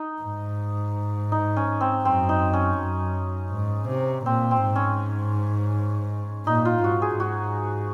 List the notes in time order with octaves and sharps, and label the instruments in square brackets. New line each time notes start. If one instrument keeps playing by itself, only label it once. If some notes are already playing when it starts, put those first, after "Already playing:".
Already playing: [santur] D#4
[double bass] G#2
[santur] D#4
C#4
C4
[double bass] F#2 [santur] C4
[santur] D#4
C#4
[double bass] F#2
G#2
C3
[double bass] A#2 [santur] C4
[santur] C4
[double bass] G#2
[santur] C#4
[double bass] A#2 [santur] D#4
[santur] F4
[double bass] G#2 [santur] F#4
[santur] G#4
[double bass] G#2 [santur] F#4